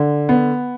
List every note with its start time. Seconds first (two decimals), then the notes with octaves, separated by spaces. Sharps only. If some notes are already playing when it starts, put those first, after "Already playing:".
Already playing: D3
0.29 B3